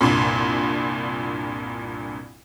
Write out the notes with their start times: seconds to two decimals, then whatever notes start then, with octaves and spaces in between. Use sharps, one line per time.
0.01 C2 G2 A#2